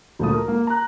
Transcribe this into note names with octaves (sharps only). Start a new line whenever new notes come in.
D2 A#2 F3 A3 A5 D#6
A#4
A#3
A#5 F#6